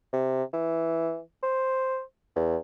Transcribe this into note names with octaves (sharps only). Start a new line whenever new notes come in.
C3
E3
C5
E2